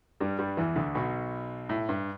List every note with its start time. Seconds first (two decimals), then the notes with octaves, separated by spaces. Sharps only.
0.20 G2 G3
0.39 G2 G3
0.57 E2 E3
0.76 D2 D3
0.95 B1 B2
1.69 A2
1.89 G2